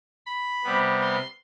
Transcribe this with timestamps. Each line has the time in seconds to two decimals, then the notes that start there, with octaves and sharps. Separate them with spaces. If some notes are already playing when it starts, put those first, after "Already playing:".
0.26 B5
0.64 C3 G3 B3
1.01 C6